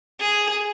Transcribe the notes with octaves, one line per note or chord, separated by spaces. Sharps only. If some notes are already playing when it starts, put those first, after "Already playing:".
G#4